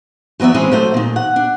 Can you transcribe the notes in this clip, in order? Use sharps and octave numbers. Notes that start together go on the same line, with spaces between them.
E3 F#3 B3 D5 E5
E3 G#3 C4 C#4 G#4
F#3 A3 C5
A#2 D#3
F#5
D4